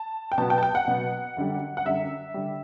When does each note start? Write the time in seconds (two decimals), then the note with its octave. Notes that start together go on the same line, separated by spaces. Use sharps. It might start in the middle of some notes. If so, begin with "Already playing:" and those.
Already playing: A5
0.32 G5
0.38 B2 F#3 B3 A5
0.50 G5
0.58 A5
0.63 G5
0.75 F#5
0.88 B2 F#3 B3
1.37 F#2 D3 G3
1.77 F#5
1.85 F#2 D3 G3 E5
2.34 D3 G3